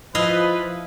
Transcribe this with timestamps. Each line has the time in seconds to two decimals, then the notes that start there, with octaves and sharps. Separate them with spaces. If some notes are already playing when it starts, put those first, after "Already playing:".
0.15 F3 E4 B4 D#5 F5